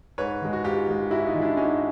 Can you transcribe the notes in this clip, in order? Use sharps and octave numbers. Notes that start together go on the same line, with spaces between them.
G#2 B4 C#5
D#3 G#3
F#4
G#2 F4 G4
D#3 G#3
G#2 E4 F#4
D#4 F4
D#3 G#3
D4 E4
G#2 C#4 D#4